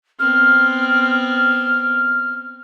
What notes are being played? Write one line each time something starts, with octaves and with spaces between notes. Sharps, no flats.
B3 C4 F6